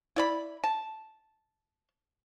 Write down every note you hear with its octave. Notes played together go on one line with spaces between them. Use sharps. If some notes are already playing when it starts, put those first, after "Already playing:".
E4 D5 B5
A5